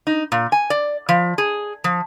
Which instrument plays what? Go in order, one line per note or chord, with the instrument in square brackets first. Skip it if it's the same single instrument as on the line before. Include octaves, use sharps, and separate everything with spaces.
[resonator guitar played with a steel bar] D#4
A#2
G#5
D5
F3
G#4
F3